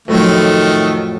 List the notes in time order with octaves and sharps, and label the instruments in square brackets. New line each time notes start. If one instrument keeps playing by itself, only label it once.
[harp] F2 A2 F#3 [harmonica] D#3 A3